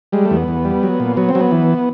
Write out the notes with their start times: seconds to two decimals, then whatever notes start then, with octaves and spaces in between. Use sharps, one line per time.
0.12 G3 G#3
0.25 A3
0.31 E2
0.36 B3
0.48 E2
0.65 G3
0.83 F#3
1.00 A#2
1.17 F#3 B3
1.29 C4
1.35 F#3
1.40 B3
1.51 E3